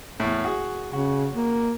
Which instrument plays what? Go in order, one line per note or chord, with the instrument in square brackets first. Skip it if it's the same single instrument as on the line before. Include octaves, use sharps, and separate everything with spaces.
[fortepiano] E2 A2
F#4 G#4
[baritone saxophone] C#3 [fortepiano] F#4
[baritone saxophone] A#3